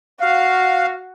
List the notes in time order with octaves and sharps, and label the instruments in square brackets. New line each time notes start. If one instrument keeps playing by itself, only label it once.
[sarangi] F#4 [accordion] F5